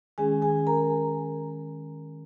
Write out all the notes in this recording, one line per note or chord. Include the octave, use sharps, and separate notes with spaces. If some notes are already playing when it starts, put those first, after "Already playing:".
D#3 G#3 C#4 G#4 G#5
G#4 G#5
A#4 A#5